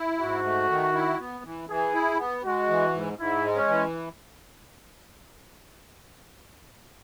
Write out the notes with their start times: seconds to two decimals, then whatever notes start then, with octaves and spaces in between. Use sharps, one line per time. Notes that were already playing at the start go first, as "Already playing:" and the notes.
Already playing: E4
0.20 G#2 F#4
0.44 A3
0.69 D#3
0.94 E4
1.19 B3
1.45 E3
1.69 E3 G#4
1.94 E4
2.19 B3
2.44 G#3 F#4
2.69 E3
2.93 G#2
3.19 G#2 E4
3.44 G#3
3.56 C#4
3.69 E3